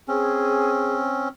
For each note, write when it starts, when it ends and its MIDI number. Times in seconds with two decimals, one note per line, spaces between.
0.08 1.29 60
0.08 1.29 61
0.08 0.95 68